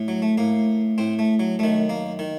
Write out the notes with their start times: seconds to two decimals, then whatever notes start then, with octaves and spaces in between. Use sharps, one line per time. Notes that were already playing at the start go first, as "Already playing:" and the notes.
Already playing: A2
0.08 F#3
0.22 A3
0.38 A2 A#3
0.98 A2 C4
1.19 A3
1.40 F#3
1.59 F#2 D#3 A3
1.89 A#3
2.19 D#3